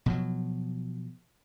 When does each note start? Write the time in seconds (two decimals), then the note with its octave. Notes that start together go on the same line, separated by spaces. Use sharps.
0.06 B2 F3 F#3